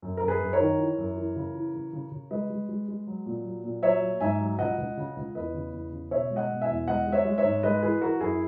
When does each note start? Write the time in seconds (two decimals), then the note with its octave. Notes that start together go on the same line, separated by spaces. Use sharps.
0.02 F#2
0.17 F#2 A#4
0.28 G#4 B4
0.40 F#2
0.53 A#4 C#5
0.60 D#3
0.78 E3
0.98 F#2
1.17 E3
1.36 C#3
1.55 E3
1.74 C#3
1.93 C#3
2.12 C#3
2.31 G#3 B4 D#5
2.50 G#3
2.69 G#3
2.88 G#3
3.07 F#3
3.26 A#2
3.44 F#3
3.64 A#2
3.83 F#3 C#5 E5
4.02 F#3
4.21 G#2 E5 G#5
4.40 F#3
4.59 C#2 D#5 F#5
4.78 C#2
4.97 C#3
5.16 C#2
5.35 E2 B4 D#5
5.54 C#3
5.73 E2
5.92 C#3
6.11 B2 C#5 E5
6.30 G#3
6.36 D#5 F#5
6.49 B2
6.62 E5 G#5
6.69 E2
6.88 G#3 D#5 F#5
7.07 G#3
7.12 C#5 E5
7.25 G#3
7.38 C#5 E5
7.44 G#2
7.63 G#3 B4 D#5
7.83 E3 G#4 B4
8.01 E3 F#4 A#4
8.20 F#2 E4 G#4